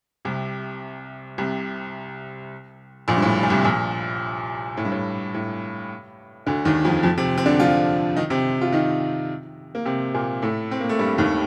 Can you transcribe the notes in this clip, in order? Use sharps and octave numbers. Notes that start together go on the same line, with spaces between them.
C2 C3
C2 C3
A#1 A#2
G2
A2
A#2
C2 C3
A#1 A#2
A2
G2
A2
A2
D2 D3
D#2 D#3
F2 F3
F2 F3
C3 C4
C4
D3 D4
F3 F4
D#3 D#4
C3 C4
F4
D#3 D#4
A#3
C3 C4
A#2 A#3
A2 A3
C4
A#3
A3
G2 G3
D#2 D#3